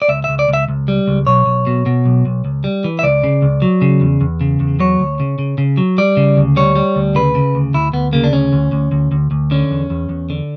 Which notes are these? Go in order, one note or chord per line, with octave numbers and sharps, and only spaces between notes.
D5
C#2 E5
C#2 E5
D5
C#2
E5
C#2
G3
C#2
B1 C#5
B1
B2
B2
B1
B1
C#2
G3
E3
E5
C#2 D5
C#3
C#2
F#3
C#3
E2
E2
C#3
E2
F#3 C#5
D2
C#3
C#3
C#3
F#3
G3 D5
C#3
D2
G3 C#5
G3
D2
C#3 B4
C#3
D2
D2 E4
D2 B3
C#3 A#3
D4
D2 C#4
D2
D2
D2
D2
D2
D3 C#4
E2
E2
E2
D3